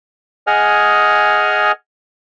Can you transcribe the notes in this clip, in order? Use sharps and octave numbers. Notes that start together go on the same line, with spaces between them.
G#4 D#5 F#5 G#5 F6